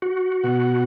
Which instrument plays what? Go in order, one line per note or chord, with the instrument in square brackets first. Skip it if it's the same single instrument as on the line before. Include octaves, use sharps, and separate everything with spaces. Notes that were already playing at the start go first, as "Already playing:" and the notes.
[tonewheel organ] F#4
[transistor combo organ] B2 F#5